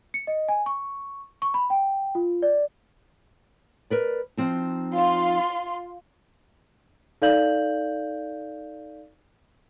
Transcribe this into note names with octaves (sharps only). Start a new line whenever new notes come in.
C#7
D#5
G#5
C#6
C#6
B5
G5
F4
D5
A#4 B4 D5
F3 C4 D#4
F4 C6
D#4 A4 D5 F5 G6 F#7